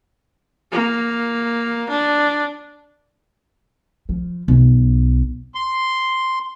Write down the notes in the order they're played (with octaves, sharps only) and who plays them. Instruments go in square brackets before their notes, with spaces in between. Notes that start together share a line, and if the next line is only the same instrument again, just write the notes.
[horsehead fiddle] A#3
D4
[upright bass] F3
B1
[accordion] C6